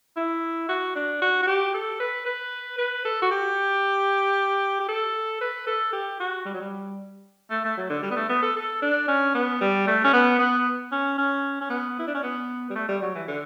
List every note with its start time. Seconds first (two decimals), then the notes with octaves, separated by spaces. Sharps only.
0.16 E4
0.69 F#4
0.95 D4
1.22 F#4
1.42 F#4
1.47 G4
1.74 A4
2.00 B4
2.26 B4
2.78 B4
3.05 A4
3.22 F#4
3.31 G4
4.80 G4
4.88 A4
5.41 B4
5.67 A4
5.93 G4
6.19 F#4
6.45 G3
6.54 F#3
6.60 G3
7.50 A3
7.64 A3
7.77 F#3
7.89 D3
8.03 G3
8.10 B3
8.16 A3
8.29 B3
8.42 A4
8.56 A4
8.82 D4
9.08 C#4
9.34 B3
9.61 G3
9.87 A3
10.04 C#4
10.13 B3
10.39 B3
10.92 C#4
11.18 C#4
11.60 C#4
11.70 B3
11.98 E4
12.07 D4
12.15 C#4
12.23 B3
12.70 G3
12.75 A3
12.88 G3
13.02 F#3
13.14 E3
13.28 D3